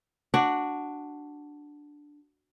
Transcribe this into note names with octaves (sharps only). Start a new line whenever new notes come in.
D4 F#4